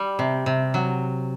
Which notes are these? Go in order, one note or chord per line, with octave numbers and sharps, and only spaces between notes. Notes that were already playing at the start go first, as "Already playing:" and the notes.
Already playing: G3
C3
C3
F#3